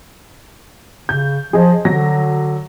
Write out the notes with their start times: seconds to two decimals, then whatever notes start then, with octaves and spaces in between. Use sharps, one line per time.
1.09 C#3 G6
1.53 F3 G#4 D#5
1.85 D3 F#3 A#6